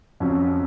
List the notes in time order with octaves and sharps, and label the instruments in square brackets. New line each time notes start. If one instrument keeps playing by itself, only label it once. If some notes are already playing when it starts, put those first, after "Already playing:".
[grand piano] F2 C#3 F#3 C#4